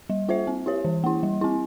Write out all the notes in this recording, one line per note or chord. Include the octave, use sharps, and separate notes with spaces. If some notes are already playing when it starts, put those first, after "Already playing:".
G3
A#3 F4 C5 E5
C4
E4 G4 C#5
E3
A#3 E4
G3
C4 E4